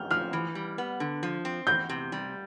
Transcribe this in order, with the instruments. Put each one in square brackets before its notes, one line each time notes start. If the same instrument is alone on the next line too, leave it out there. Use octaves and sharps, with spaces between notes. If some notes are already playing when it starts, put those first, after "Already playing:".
Already playing: [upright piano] F6 G6
[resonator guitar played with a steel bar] F3 [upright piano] F6
[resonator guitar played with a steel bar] E3
G3
B3
D3
F3
C4
[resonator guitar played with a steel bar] E2 [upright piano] G6
[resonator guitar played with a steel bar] C3
G3